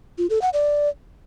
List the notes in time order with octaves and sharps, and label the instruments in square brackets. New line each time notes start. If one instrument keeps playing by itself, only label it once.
[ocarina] F4
A4
F#5
D5